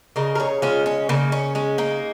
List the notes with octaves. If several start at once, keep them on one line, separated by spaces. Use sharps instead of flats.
C#3 A#4 D#5
A#4
G#4 C#5
G#3 C#4 F4
C#4
C#3 A#3 D#4
C#4
G#3 C#4
A#3 D#4